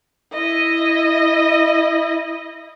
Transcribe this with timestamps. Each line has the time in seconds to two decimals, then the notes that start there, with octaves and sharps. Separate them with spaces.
0.33 E4 D#5